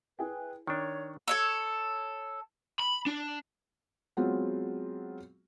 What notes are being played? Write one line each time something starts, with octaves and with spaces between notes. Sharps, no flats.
E4 G#4 B4 G5
D#3 D4 C#5 C#6
A4 C#5 E6
B5
D4
F#3 G#3 B3 C4 F4